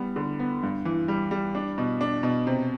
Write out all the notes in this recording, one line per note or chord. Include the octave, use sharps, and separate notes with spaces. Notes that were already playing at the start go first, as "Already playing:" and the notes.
Already playing: G3 B3
D3
B3
G2
E3
G3
G3
D4
B2
D4
B2
C3